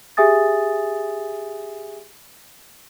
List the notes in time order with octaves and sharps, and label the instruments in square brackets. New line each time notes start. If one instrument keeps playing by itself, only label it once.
[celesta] G4 G#4 E5 G#5 D#6 A6